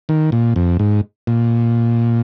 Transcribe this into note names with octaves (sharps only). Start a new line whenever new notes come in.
D#3
A#2
F2
G#2
A#2